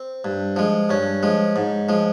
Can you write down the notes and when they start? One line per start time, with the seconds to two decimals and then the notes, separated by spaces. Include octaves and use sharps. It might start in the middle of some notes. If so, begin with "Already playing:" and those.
Already playing: C4
0.25 G2
0.56 F3 G#3
0.89 G2 C#4
1.23 F3 G#3
1.56 G#2
1.89 F3 G#3